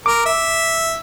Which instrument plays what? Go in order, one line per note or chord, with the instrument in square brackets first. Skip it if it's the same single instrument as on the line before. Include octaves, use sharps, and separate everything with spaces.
[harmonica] A#4 [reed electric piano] D6
[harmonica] E5